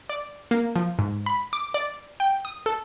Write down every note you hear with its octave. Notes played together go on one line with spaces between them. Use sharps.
D5
A#3
F3
G#2
B5
D6
D5
G5
D#6
A4